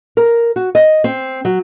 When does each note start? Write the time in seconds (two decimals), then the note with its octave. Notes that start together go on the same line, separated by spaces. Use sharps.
0.17 A#4
0.56 F#4
0.75 D#5
1.04 C4
1.45 F#3